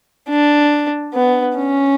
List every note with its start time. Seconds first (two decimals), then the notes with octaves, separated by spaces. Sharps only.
0.29 D4
1.14 B3
1.56 C#4